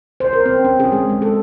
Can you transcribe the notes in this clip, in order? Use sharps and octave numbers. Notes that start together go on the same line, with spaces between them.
C5
A#4
C4
C#4
G#4
G#3
G#3
A4